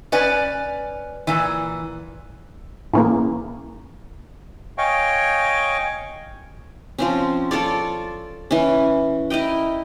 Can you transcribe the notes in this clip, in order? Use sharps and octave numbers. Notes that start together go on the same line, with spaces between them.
C#4 B4 D5 G#5
A#2 E3
A2 C#3 E3 A#3
C#5 D#5 F5 G5 G#5 C#6
F3 C4 C#4
F4 A4 C#5 D5
E3 C#4
E4 A#4 D#5 G5